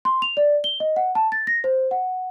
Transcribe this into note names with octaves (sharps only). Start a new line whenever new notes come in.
C6
F7
D5
G7
D#5
F#5
A5
A6
A#6
C5
F#5